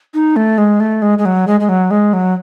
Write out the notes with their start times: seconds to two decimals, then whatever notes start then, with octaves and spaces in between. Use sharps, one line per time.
0.14 D#4
0.36 A3
0.58 G#3
0.80 A3
1.02 G#3
1.18 G#3
1.25 F#3
1.47 G#3
1.60 G#3
1.69 F#3
1.91 G#3
2.13 F#3